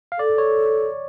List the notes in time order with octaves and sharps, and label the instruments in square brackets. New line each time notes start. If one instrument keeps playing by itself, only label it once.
[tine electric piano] F5
[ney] A4 [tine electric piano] D5
[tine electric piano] C#5